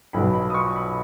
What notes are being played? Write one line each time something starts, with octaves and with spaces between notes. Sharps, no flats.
B1 B2 B5
B5
D#6
C#6
B5